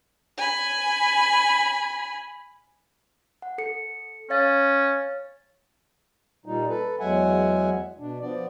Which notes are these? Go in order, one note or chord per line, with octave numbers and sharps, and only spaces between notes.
G#5 B5
F#5
A4 C#7
C#4 C#5 F5 A6
A#2 G3 D#4
A4 B4
E2 F#3 G#3 E5 F#5 G#5
B2 D4
F3 B3 D5